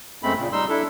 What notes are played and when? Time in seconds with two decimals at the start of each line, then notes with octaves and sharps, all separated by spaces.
0.23 F#2 G#3 A3 C4 B5
0.38 A#2 C#3
0.52 G3 D#4 C6 E6
0.69 D4 E4 A4